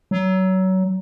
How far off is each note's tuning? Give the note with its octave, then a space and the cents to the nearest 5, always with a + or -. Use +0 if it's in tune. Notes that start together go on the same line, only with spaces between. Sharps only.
F#3 +25